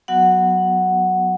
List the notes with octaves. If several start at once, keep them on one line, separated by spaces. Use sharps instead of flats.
F#3 B3 F#4 F#5